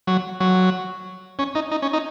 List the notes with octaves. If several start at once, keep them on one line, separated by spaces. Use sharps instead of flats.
F#3
F#3
C#4
D#4
D#4
C#4
D#4